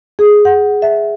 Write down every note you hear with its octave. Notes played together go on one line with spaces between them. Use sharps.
G#4
F#5
E5